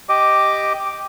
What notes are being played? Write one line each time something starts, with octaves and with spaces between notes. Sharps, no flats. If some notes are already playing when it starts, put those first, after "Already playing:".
G4 D#5 D6